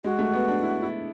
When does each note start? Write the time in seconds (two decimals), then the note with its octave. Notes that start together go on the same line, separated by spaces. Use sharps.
0.04 G#3 F#4
0.19 A3
0.34 B3
0.48 D4
0.63 E4
0.82 E4